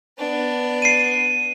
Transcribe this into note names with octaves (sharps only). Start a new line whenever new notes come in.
B3 D4
C7 D#7